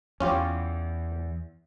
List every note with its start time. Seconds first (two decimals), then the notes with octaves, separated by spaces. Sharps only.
0.20 E2 C#4 F4 G4